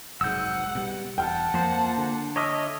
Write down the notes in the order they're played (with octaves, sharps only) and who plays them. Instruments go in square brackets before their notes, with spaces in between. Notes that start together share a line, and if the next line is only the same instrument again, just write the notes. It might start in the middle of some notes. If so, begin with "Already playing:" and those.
[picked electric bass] F1 B1 G#2 [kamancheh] F#5 [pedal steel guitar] E6 G6
[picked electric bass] B2 G3
[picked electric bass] E1 [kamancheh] F#5 A5 [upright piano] G5 F6
[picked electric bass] F2 F3 [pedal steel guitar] A#3 C5
[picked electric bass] D3
[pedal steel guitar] C#5 D#5 E5 [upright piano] A5 D6 F6